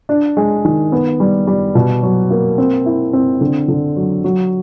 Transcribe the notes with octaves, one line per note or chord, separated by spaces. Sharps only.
D4
G#3
D#3
B3
G3
G3
B2
F#3
A#3
C4
E4
C4
D3
D3
F#3
F#3